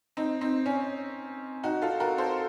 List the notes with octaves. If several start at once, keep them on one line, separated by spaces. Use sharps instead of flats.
C4 D#4
C4 D#4
C#4
D#4 F#4
F4 A4
F#4 A#4
A4 C5